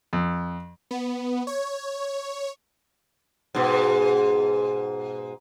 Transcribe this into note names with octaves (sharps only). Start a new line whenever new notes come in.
F2
B3
C#5
G#2 B2